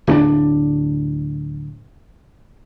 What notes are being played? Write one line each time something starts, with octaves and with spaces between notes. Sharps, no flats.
D1 C4 D4